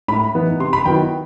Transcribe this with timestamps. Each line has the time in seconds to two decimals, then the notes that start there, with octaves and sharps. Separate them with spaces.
0.08 A2 B5
0.35 E3 B3 D#4
0.60 C3 C6
0.73 B5
0.85 D#3 F#3 B3 E4 G5